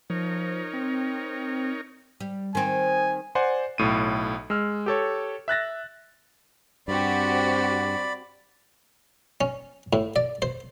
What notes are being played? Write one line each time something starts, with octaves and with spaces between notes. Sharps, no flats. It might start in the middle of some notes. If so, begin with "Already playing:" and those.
F3 D#4 A#4 C#5
C4
G3
D#3 C4 G#5
C5 D5 F#5 G#5 C6
B1 A2 D#7
G#3 E6 F6
G4 A4 C#5
E5 F#6 A6 A#6
G2 C4 F#4 G4 D5 B5
C#4
A2
D5
C5